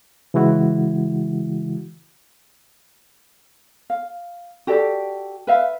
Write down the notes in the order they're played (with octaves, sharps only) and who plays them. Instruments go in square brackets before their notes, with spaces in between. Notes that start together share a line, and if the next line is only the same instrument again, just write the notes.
[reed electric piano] C#3 E3 G#3 E4 F#4
[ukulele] F5
F#4 G4 A4 D5
B4 E5 F5